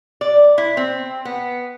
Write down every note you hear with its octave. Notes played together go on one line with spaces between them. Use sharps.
D5
E4
C4
B3